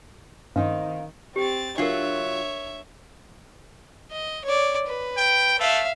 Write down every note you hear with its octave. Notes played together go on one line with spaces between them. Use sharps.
G2 D#3 C4 C#4 D#4 F5
C4 G4 A6
F#3 D4 F4 A#4 C#5 E5
D#5
C#5 D5
B4
G5
A3 E5 F5